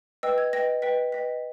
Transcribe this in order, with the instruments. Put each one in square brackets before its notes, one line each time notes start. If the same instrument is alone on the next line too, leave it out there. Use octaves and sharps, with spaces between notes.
[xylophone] B4 D#5 G5 E6
G#6
B4 D#5 G5 A#6
B4 D#5 G5 B6
B4 D#5 G5 B6